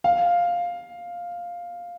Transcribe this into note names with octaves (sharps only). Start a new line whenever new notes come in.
F5